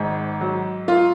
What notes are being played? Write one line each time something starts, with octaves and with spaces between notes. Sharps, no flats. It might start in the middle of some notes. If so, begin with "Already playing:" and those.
Already playing: G#1 G#2
F#3
F4